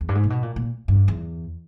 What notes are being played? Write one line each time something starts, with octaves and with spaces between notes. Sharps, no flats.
E2
G2
G#2
A#2
B2
A#2
A#2
G2
E2